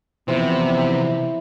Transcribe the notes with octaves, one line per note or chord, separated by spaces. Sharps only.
C3 E3 F3 B3 E4 C5 D5